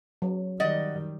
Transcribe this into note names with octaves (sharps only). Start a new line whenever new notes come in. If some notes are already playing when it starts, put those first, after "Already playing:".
F#3
D#3 G3 D5 D#5 F#5